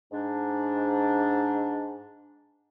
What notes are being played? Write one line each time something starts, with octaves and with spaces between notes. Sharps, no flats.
G#2 D4